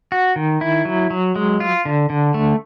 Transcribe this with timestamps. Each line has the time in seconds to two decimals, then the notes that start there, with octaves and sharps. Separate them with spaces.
0.12 F#4
0.36 D#3
0.61 E4
0.85 F#3
1.10 F#3
1.36 G#3
1.60 F4
1.85 D3
2.10 D3
2.34 A3